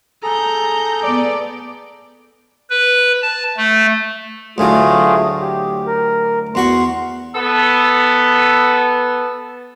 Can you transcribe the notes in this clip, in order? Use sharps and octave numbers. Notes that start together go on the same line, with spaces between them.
G#4 A4 A#5 G6
B3 D5
B4
A5
A3
D2 A2 F#3 A3 F4 G#4
G4
A#4
E2 F#4 C6 C#6
B3 A4